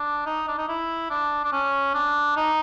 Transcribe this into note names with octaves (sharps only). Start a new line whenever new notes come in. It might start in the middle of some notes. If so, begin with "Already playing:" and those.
Already playing: D4
D#4
D4
D#4
E4
D4
D4
C#4
D4
D#4